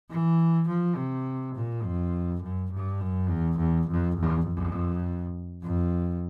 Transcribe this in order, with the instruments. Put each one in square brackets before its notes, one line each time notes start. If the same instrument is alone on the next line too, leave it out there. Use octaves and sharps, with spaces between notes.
[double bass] E3
F3
C3
A#2
F2
F#2
G2
F#2
E2
E2
F2
E2
F2
F2